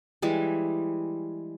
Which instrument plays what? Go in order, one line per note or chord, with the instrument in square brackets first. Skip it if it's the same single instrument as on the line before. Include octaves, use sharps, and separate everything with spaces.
[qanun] E3 G3 G#3